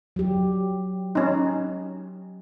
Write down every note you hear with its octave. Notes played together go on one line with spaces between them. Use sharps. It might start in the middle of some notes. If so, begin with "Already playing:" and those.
F#3 G4
C#4 D#4